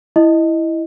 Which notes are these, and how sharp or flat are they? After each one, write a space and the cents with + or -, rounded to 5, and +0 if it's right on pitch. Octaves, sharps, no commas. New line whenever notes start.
E4 +0 D#5 +0